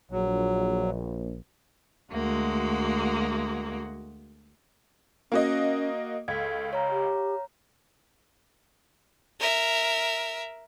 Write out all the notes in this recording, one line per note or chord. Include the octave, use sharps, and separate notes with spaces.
A#1 F#3
D2 G#3 A#3 F#4
A#3 C#4 F#4 D#5
C#2 A4 G#6 B6
C#5 F5 A#5
G4
A#4 E5